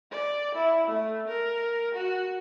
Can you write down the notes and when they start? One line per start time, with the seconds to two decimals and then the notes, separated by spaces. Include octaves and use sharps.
0.11 D5
0.55 E4
0.87 A3
1.28 A#4
1.95 F#4